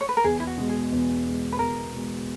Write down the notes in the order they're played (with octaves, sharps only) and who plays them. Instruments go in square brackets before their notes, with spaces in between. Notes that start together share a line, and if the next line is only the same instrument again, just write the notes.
[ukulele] C#5
B4
A#4
[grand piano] E2 [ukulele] G#4
[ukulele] E4
F#4
[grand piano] B2 G#3
[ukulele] G#4
[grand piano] E2
B2 G#3
[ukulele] B4
[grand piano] E2 [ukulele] A#4
[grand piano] B2 G#3